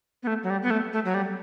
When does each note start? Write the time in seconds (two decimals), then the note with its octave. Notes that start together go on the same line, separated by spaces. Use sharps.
0.23 B3
0.27 A3
0.43 F#3
0.50 G3
0.63 B3
0.70 A3
0.93 A3
1.05 F#3
1.14 G3